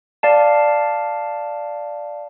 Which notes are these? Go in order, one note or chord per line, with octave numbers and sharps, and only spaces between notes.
D5 F5 A5